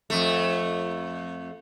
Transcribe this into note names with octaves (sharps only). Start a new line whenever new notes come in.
F2 A3